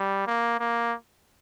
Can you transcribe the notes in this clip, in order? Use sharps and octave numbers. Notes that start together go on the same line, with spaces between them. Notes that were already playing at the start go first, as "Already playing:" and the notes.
Already playing: G3
A#3
A#3